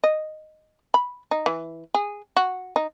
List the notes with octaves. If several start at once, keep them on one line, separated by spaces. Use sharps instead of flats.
D#5
B5
D#4
E3
G#4
F#4
D#4